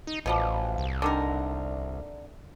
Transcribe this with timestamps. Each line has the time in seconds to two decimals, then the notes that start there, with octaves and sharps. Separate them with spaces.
0.07 D#4
0.26 A1 B2 F3 G3
0.78 C2
1.02 D3 D#3 A#4